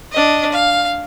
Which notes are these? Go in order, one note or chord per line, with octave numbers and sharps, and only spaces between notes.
D4 D#5
F5